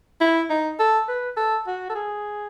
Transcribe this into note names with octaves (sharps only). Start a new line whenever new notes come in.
E4
D#4
A4
B4
A4
F#4
A4
G#4